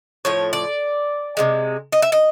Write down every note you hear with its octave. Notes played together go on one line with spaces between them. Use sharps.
A2 F3 C#5
D5
C3 D#3 G#3
D#5
E5
D#5